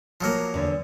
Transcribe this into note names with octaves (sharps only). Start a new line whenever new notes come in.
F3 F#3 A#3
E2 D3